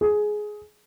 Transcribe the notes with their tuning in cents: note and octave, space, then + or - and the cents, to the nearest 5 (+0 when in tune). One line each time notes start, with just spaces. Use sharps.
G#4 +15